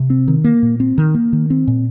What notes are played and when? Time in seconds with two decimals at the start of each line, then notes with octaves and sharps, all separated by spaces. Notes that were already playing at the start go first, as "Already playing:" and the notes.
Already playing: C3
0.10 C4
0.28 D#3
0.44 A#3
0.62 A#2
0.80 C4
0.98 D#3
1.14 A#3
1.33 D#3
1.50 C4
1.67 A#2